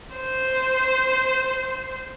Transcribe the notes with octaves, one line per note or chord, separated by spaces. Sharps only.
C5 C7